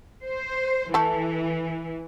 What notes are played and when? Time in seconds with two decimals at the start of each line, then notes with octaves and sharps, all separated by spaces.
0.24 C5
0.94 E3 A3 A4